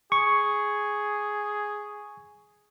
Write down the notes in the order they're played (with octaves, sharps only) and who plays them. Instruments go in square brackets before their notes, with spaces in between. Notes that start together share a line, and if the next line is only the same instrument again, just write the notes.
[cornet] G#4 [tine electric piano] C#6